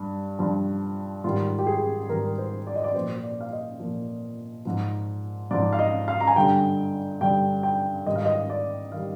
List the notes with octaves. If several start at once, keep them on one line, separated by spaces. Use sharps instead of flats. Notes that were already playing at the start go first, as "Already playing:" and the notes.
Already playing: G2
G2 F3
G#2 D#3 G3 F4
G4
G#4
G#2 D#3 G3 A#4
C5
D5
D#5
D5
A#2 F3 C5
D5
F5
D#5
A#2 F3
G#2 F3
G#2 F3 D5
F5
D#5
F5
A#5
G#5
G2 D3 G3 G5
G2 D3 G3 G5
G5
G#2 D#3 G3 D#5
F5
D#5
D5
D#3 G3 F5